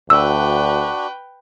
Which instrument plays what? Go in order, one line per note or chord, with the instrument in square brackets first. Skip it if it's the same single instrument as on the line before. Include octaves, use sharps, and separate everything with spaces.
[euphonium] D2 [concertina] D4 F#4 [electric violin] B4 G5 [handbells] E6